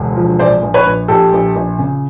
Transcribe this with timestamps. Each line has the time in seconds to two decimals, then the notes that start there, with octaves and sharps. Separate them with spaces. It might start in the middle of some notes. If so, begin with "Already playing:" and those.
Already playing: E1 D2
0.16 F3
0.39 A#1 C5 D5
0.62 A#1
0.74 B4 C#5
0.86 A#1
1.08 A#1 G4 A4
1.33 A#1
1.55 A#1
1.78 C#3